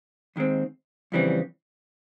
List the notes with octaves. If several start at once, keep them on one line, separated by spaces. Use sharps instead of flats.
D#2 D#3 G#3 C4
F2 C#3 E3 G3 C4